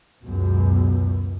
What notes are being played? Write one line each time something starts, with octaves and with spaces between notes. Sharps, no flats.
C#2 F#2 B2